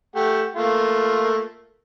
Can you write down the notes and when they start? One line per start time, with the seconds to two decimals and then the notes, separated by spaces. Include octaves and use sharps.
0.15 A3 G4 F#5
0.56 A3 A#3 F4